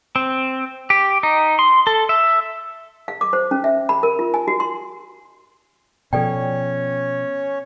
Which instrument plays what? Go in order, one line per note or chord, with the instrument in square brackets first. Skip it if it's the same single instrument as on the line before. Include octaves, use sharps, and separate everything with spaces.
[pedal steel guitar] C4
G4
D#4
C6
A4
E5
[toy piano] F5
D6
C5
C#4
E5
B5
A#4
F4
G#5
F#4
C6
[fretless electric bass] B2 F3 [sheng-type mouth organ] C#4 C#5 [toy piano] A4 D5 G5